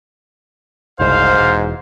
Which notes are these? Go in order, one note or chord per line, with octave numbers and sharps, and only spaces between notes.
F#1 C2 G#2 C5 F5
E1